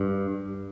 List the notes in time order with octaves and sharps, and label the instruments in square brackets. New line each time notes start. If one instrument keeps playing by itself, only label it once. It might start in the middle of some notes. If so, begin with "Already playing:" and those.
Already playing: [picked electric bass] G2